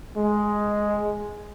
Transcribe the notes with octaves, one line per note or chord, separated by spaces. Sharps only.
G#3